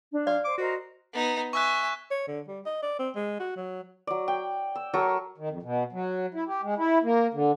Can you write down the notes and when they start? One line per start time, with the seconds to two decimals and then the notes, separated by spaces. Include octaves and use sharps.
0.12 D4
0.27 D5 F5
0.45 C5 D6
0.58 F#4 A#4 C5 D#5
1.13 B3 D#4
1.53 E5 G#5 C#6 E6 F#6
2.11 C#5
2.28 D3
2.48 G3
2.66 D#5
2.83 D5
2.99 C4
3.16 G#3
3.40 F#4
3.56 F#3
4.07 F#3 D5
4.28 G5
4.75 E6
4.93 F#3 A4 A#4 C#6
5.38 D#3
5.49 F2
5.63 B2
5.92 F#3
6.34 E4
6.47 G4
6.62 G#3
6.78 E4
7.03 A#3
7.34 D3